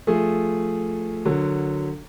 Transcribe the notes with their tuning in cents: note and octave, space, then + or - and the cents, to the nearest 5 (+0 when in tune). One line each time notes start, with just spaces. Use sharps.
F3 +0 A3 +0 G#4 +0
D3 +5 F#3 -15 A#4 +0